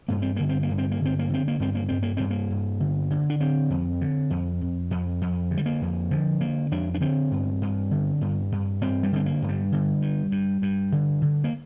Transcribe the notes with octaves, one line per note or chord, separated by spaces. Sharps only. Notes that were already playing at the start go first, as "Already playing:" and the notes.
G2 A#3
C4
D3 A#3
C4
A#3
G2
C4
A#3
D3 C4
A#3
D3 C4
A#3
G2 C4
A#3
G2 C4
A#3
G2 C4
A#3
G2
D3
D3
D4
D3 C4
F2
D3
F2
F2
F2
F2
D3
G3
A#3
F2
D3 F3
D3 A#3
F2 D4
D4
D3 C4
G2
G2
D3
G2
G2
G2 C4
G3
D3 C4
A#3
G2
G3
D3
G2
G2
G2
D3
D3
A#3